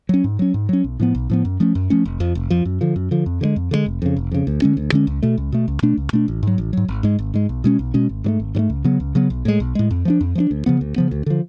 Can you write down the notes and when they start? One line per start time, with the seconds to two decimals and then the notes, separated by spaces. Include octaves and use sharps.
0.09 F#3 C#4
0.24 G#2
0.39 F#3 C#4
0.54 G#2
0.69 F#3 C#4
0.84 B1
1.00 A2 F3 B3
1.15 B1
1.30 A2 F3 B3
1.45 F#2
1.60 F3 A3 C#4
1.75 F#2
1.90 F3 A3 C#4
2.05 F1
2.20 F2 F3
2.35 F1
2.50 F2 F3
2.65 F#2
2.81 D3 F3
2.96 F#2
3.11 D3 F3
3.26 F2
3.41 D3 F3 G#3
3.56 F2
3.71 D3 F3 G#3
3.86 F1
4.02 F2 C#3
4.16 F1
4.31 F2 C#3
4.47 D2
4.62 D3 G#3 C#4
4.77 D2
4.92 D3 G#3 C#4
5.07 C#2
5.23 B2 A3
5.37 C#2
5.52 B2 A3
5.68 C#2
5.83 B2 A3 D4
5.97 C#2
6.13 B2 A3 D4
6.28 A1
6.43 G#2 F#3
6.58 A1
6.73 G#2 F#3
6.88 G#1
7.03 G#2 G#3
7.19 G#1
7.34 G#2 G#3
7.49 B1
7.64 B2 G#3 C#4
7.79 B1
7.94 B2 G#3 C#4
8.09 G#1
8.24 G#2 F#3 A3
8.40 G#1
8.55 G#2 F#3
8.59 A3
8.70 C#2
8.84 C#3 F#3 B3
9.00 C#2
9.15 C#3 F#3 B3
9.30 B1
9.45 A2 G#3
9.60 B1
9.75 A2 G#3
9.91 F2
10.05 F3 A3 D4
10.21 F2
10.35 F3 A3 D4
10.51 D2
10.66 C#3 F3 B3
10.81 D2
10.96 C#3 F3 B3
11.11 D2
11.26 D3 F3